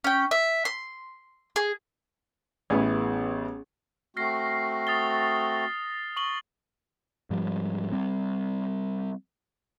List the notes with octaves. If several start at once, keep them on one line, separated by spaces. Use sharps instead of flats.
C#4 G5
E5
C6
G#4
A1 B3 C#4 E4 G#4 G#6
A3 C4 F#4 F6 A#6 C7
D#6 A6 G7
C#6 F#7 G7
G#2 F3 G3
G3 C4